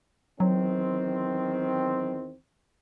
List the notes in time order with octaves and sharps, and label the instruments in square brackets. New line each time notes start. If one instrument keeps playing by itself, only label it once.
[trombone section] E2 D#3 C4 [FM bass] F#3